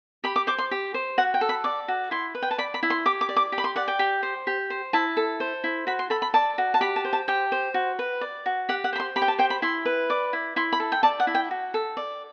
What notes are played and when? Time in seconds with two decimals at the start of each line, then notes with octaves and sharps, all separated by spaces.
0.24 G4 B5
0.36 D6
0.47 C5 D6
0.58 C6
0.71 G4
0.94 C5
1.18 F#4 F#5
1.34 G5
1.41 A4
1.49 B5
1.64 D5 D6
1.88 F#4
2.11 E4 C6
2.35 B4
2.42 G5
2.51 A5
2.58 D5 B5
2.74 B5
2.83 E4
2.90 C6
3.05 G4 D6
3.21 D6
3.29 D5
3.36 D6
3.52 G4
3.58 B5
3.64 C6
3.76 D5 F#5
3.88 G5
3.99 G4
4.23 C5
4.47 G4
4.70 C5
4.93 E4 A5
5.17 A4
5.40 C5
5.64 E4
5.87 F#4 B5
5.99 C6
6.10 A4 B5
6.22 B5
6.34 D5 A5
6.58 F#4
6.74 A5
6.81 G4 B5
6.96 A5
7.05 C5
7.13 A5
7.28 G4 G5
7.52 C5
7.74 F#4
7.99 B4
8.21 D5
8.46 F#4
8.69 G4 F#5
8.84 F#5
8.93 C5 B5
9.00 C6
9.16 G4 B5
9.22 G5
9.28 A5
9.39 C5 G5
9.50 B5
9.62 E4 C6
9.85 B4
10.10 D5 D6
10.33 E4
10.56 E4 C6
10.73 B5
10.80 A4
10.92 G5
11.03 D5 A5
11.20 F#5
11.27 E4
11.35 G5
11.51 F#4
11.74 A4
11.97 D5